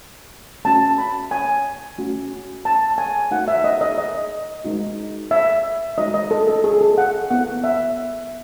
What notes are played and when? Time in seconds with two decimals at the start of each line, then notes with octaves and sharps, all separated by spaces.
0.65 A3 C#4 F#4 A5
0.98 B5
1.31 G#5
1.98 A3 C#4 F#4
2.65 A5
2.98 G#5
3.31 A3 D#4 F#4 F#5
3.48 E5
3.64 D#5
3.81 D#5
3.98 D#5
4.64 G#3 D#4 F#4
5.31 E5
5.98 G#3 D#4 F#4 D#5
6.14 D#5
6.31 A4
6.47 A4
6.64 G#4
6.81 A4
6.98 F#5
7.30 B3 E4 F#5
7.64 E5